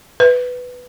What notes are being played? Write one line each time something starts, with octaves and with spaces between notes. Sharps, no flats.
B4